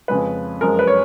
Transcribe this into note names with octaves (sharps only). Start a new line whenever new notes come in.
F2 C#3 G#3 B4
F#2 F3 G#3 A#4
B4
C#5